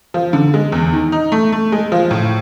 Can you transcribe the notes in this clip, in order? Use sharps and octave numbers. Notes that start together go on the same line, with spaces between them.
F3
D3
G#3
E2
D#3
D#4
A3
A3
G#3
F3
A2